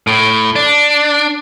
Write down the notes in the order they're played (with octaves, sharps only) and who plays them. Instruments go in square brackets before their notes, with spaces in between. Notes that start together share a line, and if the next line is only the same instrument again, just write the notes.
[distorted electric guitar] A2
D4